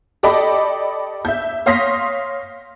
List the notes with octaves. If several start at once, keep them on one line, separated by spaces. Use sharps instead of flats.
G4 A4 D5 D#5 B5 D6
E5 G6
C#5 F5 C6 D#6 A#6 B6